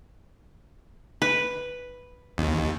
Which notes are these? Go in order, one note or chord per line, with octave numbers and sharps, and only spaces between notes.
B4
D#2